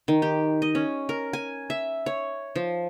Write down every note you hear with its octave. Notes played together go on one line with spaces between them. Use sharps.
D#3
G4
D#5
C#4
A#4
G#5
E5
C#5
F3